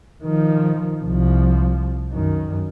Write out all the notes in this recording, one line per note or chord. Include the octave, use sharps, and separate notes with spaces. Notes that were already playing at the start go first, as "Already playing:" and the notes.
D#3 F3
C2 F3
F#2 D#3